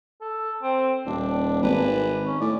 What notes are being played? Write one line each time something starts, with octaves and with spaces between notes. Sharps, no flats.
A4
C4
D#1 D4
G#1 B4
C#4
A2 D5